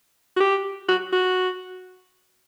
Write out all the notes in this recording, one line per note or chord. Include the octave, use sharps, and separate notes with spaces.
F#4
G4
F#4
F#4